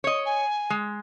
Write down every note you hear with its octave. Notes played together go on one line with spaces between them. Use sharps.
C#5 D#5
G#5
G#3